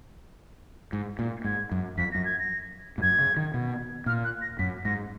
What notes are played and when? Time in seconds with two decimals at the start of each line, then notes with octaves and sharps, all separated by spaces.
0.93 G#2
1.19 A#2
1.44 G#2 G#6
1.72 F#2
1.98 F2 B6
2.12 F#2 A#6
2.25 G#6
2.39 A#6
2.98 G#2
3.02 F#2 G#6
3.19 C#3
3.37 D#3
3.54 B2
4.06 A#2 F6
4.24 F#6
4.42 A#6
4.59 F#2 B6
4.85 G#2 A#6